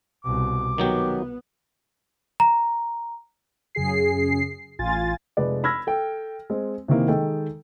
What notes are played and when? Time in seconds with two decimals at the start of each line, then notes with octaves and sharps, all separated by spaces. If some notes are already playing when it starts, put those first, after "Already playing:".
0.24 C2 B2 D6
0.78 D#3 F#3 B3 G4
2.40 A#5
3.75 F#2 C#3 G#4 C7
4.79 A1 F4 G#5 A6
5.37 F1 G#3 B4 D5
5.64 B5 E6 F6 G#6 A#6
5.87 A4 G5
6.50 G#3 C4
6.88 C3 D#3 E3 A#3
7.08 D#3 G#3 A4 G5